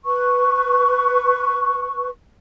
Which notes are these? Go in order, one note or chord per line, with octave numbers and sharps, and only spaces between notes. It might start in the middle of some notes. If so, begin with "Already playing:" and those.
B4 C#6